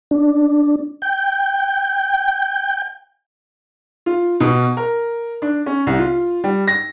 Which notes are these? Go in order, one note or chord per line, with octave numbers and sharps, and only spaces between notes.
D4
G5
F4
B2
A#4
D4
C#4
C2
F4
G3
A#6